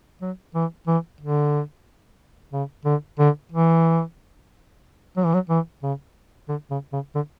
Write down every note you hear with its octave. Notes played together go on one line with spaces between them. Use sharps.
F#3
E3
E3
D3
C#3
D3
D3
E3
F#3
E3
F#3
E3
C#3
D3
C#3
C#3
D3